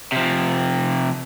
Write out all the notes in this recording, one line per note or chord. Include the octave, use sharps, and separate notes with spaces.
C3 F3